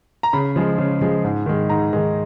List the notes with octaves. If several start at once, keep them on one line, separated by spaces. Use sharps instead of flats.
A#5
C#3 B5
F3 G#3
C#3
F3 G#3
G#2
D#3 G#3
G#2 A#5
D#3 G#3